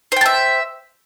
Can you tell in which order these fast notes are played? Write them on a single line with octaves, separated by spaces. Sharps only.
C5 G5 A5 E5